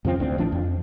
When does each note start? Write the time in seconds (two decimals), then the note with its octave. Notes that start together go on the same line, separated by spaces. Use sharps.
0.05 F2 C#3 F3 C4
0.18 D1 D2 C4
0.38 A1 F3 D4
0.52 F2